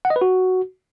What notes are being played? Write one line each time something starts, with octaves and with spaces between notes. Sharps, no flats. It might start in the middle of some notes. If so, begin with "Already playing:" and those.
F#5
D#5
B4
F#4